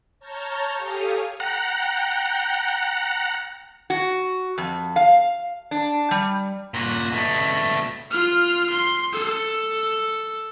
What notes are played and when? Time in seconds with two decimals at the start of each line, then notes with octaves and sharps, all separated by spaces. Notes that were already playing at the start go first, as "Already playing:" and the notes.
0.20 C#5 A5 A#5 C#6 F6 G6
0.77 G4 A4 F5 G#5 D#6 F6
1.40 F#5 G5 A#5
3.90 F#4
4.58 F2
4.96 F5
5.71 D4
6.11 G3
6.74 A#2 F#4
7.13 B2 A3
8.11 F4 F6
8.70 C6
9.13 A4